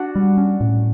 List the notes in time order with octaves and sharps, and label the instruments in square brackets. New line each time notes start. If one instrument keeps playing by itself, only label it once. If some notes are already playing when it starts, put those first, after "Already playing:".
Already playing: [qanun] D4 F#4
[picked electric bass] G3
C#4
A2